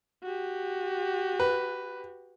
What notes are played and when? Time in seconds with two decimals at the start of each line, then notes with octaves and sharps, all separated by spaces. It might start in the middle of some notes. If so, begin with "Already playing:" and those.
0.23 F#4 G4
1.40 B4